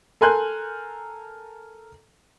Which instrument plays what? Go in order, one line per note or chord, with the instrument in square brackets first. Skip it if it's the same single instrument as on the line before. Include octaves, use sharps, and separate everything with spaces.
[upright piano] A4 A#4 G#5 C6 F#6 G6